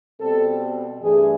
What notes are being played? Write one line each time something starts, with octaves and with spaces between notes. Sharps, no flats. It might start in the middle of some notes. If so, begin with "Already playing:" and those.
B2 G3 C4 A4
G2 E3 A3 D4 G#4